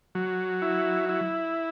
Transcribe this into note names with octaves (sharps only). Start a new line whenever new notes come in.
F#3
E4
E4